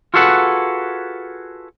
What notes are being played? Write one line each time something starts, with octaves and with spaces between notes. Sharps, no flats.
F4 F#4 G#4 A4 B4 F#5